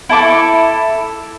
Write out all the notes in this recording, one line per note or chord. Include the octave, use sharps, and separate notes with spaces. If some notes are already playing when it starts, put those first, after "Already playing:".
E4 A4 D6